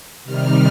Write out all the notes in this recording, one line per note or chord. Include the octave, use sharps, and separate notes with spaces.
C3 D#3 G3 F6